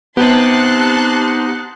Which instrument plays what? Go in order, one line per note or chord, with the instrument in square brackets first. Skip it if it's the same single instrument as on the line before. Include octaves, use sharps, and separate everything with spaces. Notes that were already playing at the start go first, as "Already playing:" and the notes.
[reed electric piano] B3 [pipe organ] D#4 F#5 [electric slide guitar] G4 C5 [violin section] A5 C6 F#6